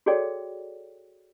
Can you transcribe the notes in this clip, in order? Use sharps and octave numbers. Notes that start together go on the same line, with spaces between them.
F#4 G#4 A4 C#5 D5 G5